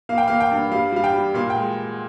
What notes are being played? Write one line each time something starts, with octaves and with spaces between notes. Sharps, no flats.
A#3 F5
G5
A#3 F5
G5
G2
G3 F5
G3 F5
G5
G3
A#2 F5
G5
G#3